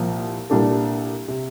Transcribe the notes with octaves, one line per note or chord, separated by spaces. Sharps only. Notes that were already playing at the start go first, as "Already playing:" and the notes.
Already playing: C2 A#2 F3
C2 A#2 G3 D4 A4
C3